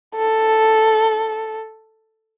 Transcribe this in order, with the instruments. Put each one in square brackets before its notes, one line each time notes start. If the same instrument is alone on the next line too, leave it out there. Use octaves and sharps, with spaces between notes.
[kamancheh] A4